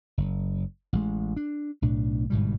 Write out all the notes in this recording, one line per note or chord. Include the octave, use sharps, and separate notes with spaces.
F#1
A1 G#3
D4
B1 A2 D4
G1 G#2 B2 G3